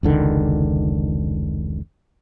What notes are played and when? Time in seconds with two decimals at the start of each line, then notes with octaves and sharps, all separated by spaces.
0.03 F1 C#2 D3 D#3